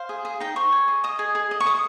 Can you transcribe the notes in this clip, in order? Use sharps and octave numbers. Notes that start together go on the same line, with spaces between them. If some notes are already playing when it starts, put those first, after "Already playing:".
Already playing: C5 F5
G#4
G#4
D#4 G5
C5 C#6
G#4
D#5
D#5 D#6
G#4
G#4
D#5
C#6
D#5 D#6